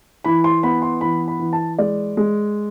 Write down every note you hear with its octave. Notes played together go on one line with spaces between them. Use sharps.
E3 B5
C6
B3 B5
C6
E3 B5
B5
E3
A5
G#3 D5
G#3